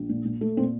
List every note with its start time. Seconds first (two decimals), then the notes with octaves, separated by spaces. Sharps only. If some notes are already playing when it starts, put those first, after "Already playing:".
Already playing: A#1
0.09 A#2
0.25 A#2
0.41 A3
0.57 A#2 C4